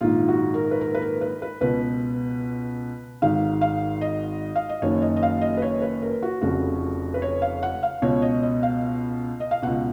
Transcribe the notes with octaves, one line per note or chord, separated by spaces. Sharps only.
A#1 G#2 D#3 F4
F#4
A#4
B4
A#4
B4
A#4
B4
B4
C#2 B2 B4
G#1 G#2 D#3 F5
F5
D#5
F5
D#5
F#1 F#2 D#3 C#5
D#5
D#5
F5
D#5
B4
C#5
B4
A#4
F#4
F1 F2 C#3 F#4
B4
C#5
F5
F#5
F5
C#2 B2 C#5
D#5
D#5
F5
D#5
F5
C#2 B2 F#5